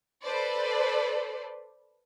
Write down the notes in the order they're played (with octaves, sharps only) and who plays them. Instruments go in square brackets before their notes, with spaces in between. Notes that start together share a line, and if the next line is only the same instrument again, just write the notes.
[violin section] A4 B4 C5 D5